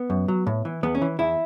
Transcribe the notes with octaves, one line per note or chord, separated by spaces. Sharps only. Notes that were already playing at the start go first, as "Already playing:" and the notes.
Already playing: B3
F#2
F#3
A2
E3
E2 B3
C#4
E3
E2 E4